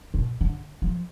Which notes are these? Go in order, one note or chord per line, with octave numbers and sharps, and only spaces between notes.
B2
D3
F3